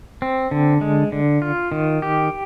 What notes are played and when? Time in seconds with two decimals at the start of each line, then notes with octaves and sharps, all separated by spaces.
0.22 C4
0.51 D3
0.81 G#3
1.12 D3
1.42 F4
1.72 D#3
2.02 G4